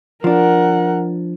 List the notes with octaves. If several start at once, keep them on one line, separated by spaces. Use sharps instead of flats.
F3 D4 A#4 F#5